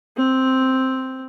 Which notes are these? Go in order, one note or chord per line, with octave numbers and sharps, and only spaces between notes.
C4